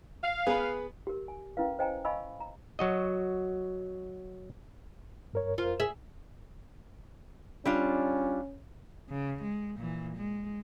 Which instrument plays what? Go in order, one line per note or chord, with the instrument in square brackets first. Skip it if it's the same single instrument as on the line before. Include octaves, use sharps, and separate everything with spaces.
[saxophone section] F5
[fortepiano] B3 B4 [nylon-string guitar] G#4
[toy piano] G4 A#4
G#5
C#4 E4 A#4 B4 F5
C5 D#5 G5 G#5 A#5
D#5 F5 G#5 B5 C#6 E6
A#5
[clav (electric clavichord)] F#3 F#4 D#5
[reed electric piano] G2 A#4 C#5
[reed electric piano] F2 A#4 C5 [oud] F4
[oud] G#4 E5
[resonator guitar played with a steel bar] G3 D4 F4 [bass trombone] C#4
[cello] C#3
G#3
A#2 E3
G#3